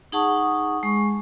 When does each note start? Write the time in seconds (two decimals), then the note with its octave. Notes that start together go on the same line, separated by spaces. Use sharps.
0.12 D#4 G#4 F#5 A5 C#6 D#6
0.83 G#3 C#6